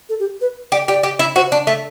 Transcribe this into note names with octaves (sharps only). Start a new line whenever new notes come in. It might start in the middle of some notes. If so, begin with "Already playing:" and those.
A4
G4
B4
G4 D5
G4 D5
G4
E4
F#4 C5
D4 D5
A3 E5